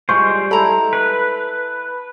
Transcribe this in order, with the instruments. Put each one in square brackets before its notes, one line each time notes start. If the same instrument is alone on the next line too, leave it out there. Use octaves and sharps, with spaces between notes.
[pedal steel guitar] G3 G#3 C5 [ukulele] F4 [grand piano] C#6
[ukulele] E4 A#5 B5 [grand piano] A4
[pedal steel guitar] B4